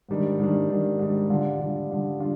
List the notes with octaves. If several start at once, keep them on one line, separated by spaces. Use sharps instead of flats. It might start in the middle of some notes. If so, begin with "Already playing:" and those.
G#2 D#3 G3 D4
G#2 D#3 G3 D4
G#2 D#3 G3 D4
G#2 D#3 G3 D4
D3 G3 D4 F4
D3 G3 D4 F4
D3 G3 D4 F4
D3 G3 D4 F4